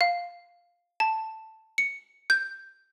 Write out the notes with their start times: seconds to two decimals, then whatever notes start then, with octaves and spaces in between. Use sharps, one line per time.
0.01 F5
1.00 A5
1.78 C#7
2.30 G6